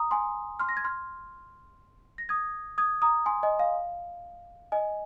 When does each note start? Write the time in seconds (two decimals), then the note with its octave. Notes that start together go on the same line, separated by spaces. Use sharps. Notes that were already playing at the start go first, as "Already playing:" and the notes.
Already playing: A#5 D#6
0.11 G#5 C6
0.59 C6 F6
0.69 A#6
0.77 G#6
0.84 C6 F6
2.18 A#6
2.29 D#6 G#6
2.78 D#6 G#6
3.02 A#5 D#6
3.26 G#5 C6
3.43 D#5 G#5
3.59 F5
4.72 D#5 G#5